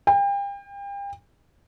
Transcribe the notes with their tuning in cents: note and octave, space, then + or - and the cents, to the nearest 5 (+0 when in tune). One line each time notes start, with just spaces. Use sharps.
G5 +35